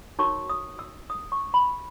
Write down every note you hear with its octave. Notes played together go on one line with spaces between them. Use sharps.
D#4 F#4 A#4 C#5 C#6
D#6
E6
D#6
C#6
B5